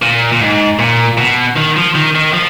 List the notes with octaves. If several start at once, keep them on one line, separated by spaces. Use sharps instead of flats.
A#2
A#2
G#2
A#2
B2
D#3
F3
D#3
D#3
F3